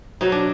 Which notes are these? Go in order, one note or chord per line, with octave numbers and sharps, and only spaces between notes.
B2 F#3 D#4
D4